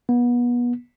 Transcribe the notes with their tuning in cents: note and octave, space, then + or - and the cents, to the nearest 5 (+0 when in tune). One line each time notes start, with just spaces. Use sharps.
B3 -30